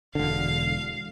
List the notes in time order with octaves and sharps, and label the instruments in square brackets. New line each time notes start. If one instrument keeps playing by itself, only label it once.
[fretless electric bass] E1 D3 [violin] F5